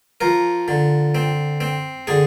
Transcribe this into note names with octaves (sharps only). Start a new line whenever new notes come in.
F3 A#4
D3
C4
C4
D3 G#4